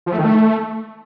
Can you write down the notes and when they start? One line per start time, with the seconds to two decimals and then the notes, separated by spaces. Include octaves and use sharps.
0.06 F3
0.12 A3
0.18 D#3
0.24 A3